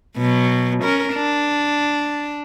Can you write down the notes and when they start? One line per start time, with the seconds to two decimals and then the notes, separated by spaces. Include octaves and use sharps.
0.17 B2 F#3
0.83 C#4 A#4
1.14 D4